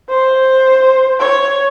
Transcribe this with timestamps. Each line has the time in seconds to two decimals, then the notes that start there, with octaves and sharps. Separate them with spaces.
0.09 C5
1.20 C#5